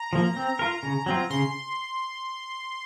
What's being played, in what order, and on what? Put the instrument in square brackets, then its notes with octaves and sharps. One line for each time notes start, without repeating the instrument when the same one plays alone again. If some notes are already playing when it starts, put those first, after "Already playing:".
Already playing: [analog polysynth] A#5
[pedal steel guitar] F3 A#3
C4
F4 A#4
C#3
F#3 C4 F4
[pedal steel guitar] C#3 [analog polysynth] C6